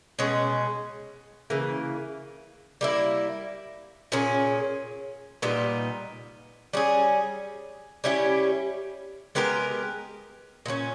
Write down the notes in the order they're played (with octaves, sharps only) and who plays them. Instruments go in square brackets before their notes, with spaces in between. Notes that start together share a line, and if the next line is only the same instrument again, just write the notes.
[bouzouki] B2 G#3 C#4
C#3 E3 A#3
G3 A#3 E4
A#2 A#3 C#4 G#4
A#2 G3 B3 D#4
G3 C#4 G#4
G3 C#4 E4 G4
G#3 B3 G4 A#4
A#2 A#3 C#4